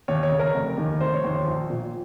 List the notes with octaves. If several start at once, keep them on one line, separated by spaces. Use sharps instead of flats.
D#2 C#5
C#5
C#3
A#4
F1
D#2 D#3
F1 C5
C#5
D#2 D#3 C5
A#1
A#2